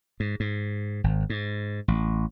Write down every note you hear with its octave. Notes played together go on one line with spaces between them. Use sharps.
G#2
G#2
G#1
G#2
A1